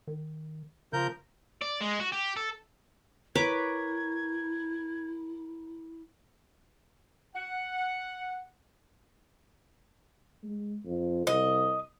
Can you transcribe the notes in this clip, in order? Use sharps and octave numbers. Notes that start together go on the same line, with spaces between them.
D#3
C#3 F3 A#4 G6
D5
G#3
F#4
G4
A4
E4 A#4 B4 C#5 D6 G#6
F#5
G#3
F2
C2 D#5